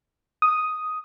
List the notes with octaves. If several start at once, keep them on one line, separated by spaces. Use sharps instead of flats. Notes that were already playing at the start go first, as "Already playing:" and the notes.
D#6